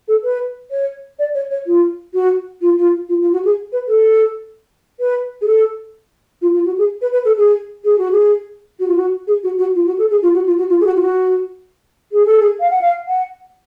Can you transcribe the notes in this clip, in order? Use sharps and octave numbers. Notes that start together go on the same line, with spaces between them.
A4
B4
C#5
D5
C#5
C#5
F4
F#4
F4
F4
F4
F4
F#4
G#4
B4
A4
B4
G#4
A4
F4
F4
F#4
G#4
B4
B4
A4
G#4
G#4
F#4
G#4
F#4
F4
F#4
G#4
F#4
F#4
F4
F#4
A4
G#4
F4
F#4
F4
F#4
F4
G#4
F#4
F4
F#4
G#4
A4
G#4
F5
F#5
F5
F#5